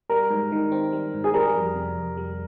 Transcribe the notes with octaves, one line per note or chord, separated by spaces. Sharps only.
G3 A#4
G#2
D#3
C4
G3
G#2
G#4
G3 A#4
F2
C3
F2
G3